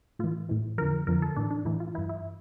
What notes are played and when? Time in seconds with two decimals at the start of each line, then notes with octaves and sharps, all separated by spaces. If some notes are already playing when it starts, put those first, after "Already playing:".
0.19 A2 E3 F4
0.49 A2 E3
0.78 F2 D3 F3 A#4
1.07 F2 D3 F3 A#4
1.22 A4
1.36 A2 E3 D4
1.51 D4
1.65 A2 E3 E4
1.80 F4
1.95 G2 E3 E4
2.09 E4